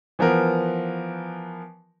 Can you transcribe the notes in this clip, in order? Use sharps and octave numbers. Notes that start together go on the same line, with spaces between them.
E3 F3 B3 A#4